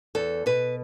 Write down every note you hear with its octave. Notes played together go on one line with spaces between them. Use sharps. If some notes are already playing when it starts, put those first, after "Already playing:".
E2 A4
B2 B4